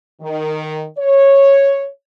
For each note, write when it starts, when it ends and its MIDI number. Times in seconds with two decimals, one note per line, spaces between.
0.21 0.85 51
0.98 1.86 73